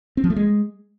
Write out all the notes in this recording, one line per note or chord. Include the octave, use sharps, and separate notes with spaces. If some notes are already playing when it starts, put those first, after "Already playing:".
C4
F3
A3
G#3